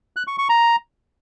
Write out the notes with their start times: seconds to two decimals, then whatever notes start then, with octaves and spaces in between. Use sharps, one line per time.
0.16 F#6
0.27 C#6
0.38 C#6
0.49 A#5